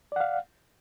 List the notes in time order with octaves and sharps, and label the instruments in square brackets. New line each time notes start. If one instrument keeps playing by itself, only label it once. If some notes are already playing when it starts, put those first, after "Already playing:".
[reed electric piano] D5
F#5
F5